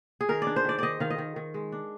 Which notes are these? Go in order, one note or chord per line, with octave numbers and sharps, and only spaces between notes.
G#4
D#3 A#4
D5
D4
C5
D#3 D5
D#3 D5 D#5
D#3 F5
D#5
D#3
D#3
G#3
D4